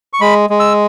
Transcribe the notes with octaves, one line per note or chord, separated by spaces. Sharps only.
C#6
G#3 B5
G#3
E6